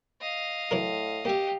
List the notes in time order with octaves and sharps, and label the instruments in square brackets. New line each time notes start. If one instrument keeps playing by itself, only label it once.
[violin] D#5 F5
[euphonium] A2 [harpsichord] E3 F#3 A#4
[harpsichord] A#3 E5 [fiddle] G4